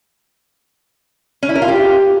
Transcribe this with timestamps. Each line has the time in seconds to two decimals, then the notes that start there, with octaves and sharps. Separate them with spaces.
1.43 C#4
1.49 E4
1.55 A#4
1.62 F4
1.68 G4